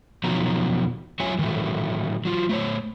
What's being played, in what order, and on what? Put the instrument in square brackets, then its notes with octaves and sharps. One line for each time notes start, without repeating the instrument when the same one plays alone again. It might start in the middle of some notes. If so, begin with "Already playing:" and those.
[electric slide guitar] E2 B2 D#3 F3 F#3 A#5
F#3 F4 F#4 C#5 E5 G#5
A2 D#3 E3 F#3 A3
F#3 F4
A3 C5 C#5